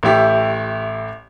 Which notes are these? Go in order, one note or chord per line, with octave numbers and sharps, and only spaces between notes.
A1 A3 E4 G4